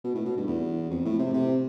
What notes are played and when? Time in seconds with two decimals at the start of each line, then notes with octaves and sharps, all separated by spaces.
0.04 B2
0.15 A2
0.25 B2
0.37 G2
0.47 E2
0.90 F2
1.05 A2
1.19 C3
1.33 C3